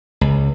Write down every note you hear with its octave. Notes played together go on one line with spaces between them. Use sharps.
C#2